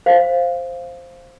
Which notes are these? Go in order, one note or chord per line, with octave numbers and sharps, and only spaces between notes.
C5 F5